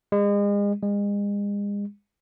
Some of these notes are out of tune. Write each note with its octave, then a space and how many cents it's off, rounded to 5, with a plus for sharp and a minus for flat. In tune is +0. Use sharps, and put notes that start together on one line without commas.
G#3 -35
G#3 -35